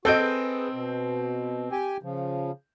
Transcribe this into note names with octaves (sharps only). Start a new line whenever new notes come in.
C4 F#4 A4 D#5 G6 D7
G#4 B4
B2
G4 G5 G#5
C#3 F3